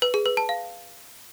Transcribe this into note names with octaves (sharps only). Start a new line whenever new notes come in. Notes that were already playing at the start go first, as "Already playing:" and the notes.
B4
G#4
B4
A5
F5